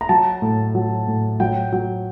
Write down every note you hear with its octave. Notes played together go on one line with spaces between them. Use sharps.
A#5
F#3 A5
A2
F#3
A2
F#3 G5
F#3